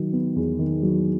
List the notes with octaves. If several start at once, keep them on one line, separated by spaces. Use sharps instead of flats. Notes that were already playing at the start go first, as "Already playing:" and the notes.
Already playing: D#3 F#3
B3
E2
D#3
F#3